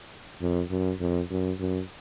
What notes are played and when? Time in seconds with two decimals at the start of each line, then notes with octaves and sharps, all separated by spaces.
0.42 F2
0.71 F#2
1.00 F2
1.31 F#2
1.60 F#2